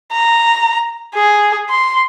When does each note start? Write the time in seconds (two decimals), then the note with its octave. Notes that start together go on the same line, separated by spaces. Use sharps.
0.13 A#5
1.15 G#4
1.70 C6